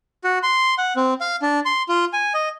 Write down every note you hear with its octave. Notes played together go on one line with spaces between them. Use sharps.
F#4
C6
F#5
C4
F5
D4
C6
F4
G#5
D#5